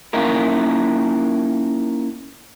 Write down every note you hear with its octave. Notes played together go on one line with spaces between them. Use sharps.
A#3 C#4 D#4 E4 A#4